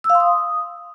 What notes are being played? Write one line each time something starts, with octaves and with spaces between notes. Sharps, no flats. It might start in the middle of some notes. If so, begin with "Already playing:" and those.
E6
F5
C6
D#6